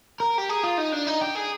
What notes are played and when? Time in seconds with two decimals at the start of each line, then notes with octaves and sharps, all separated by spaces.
0.20 A#4
0.38 G4
0.49 G#4
0.63 F4
0.78 D#4
0.92 D4
1.07 D#4
1.21 G4
1.35 G#4